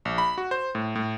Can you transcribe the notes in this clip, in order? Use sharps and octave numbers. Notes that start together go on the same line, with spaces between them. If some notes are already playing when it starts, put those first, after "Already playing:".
A#1
B5
F#4
C5
A2
A2